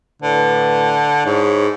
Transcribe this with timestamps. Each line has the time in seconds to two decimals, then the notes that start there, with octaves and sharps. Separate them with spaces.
0.22 A2 D3 B4
1.26 G#2 E4 G#4 C#5